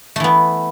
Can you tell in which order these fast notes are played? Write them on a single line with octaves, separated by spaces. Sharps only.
A3 E3 B3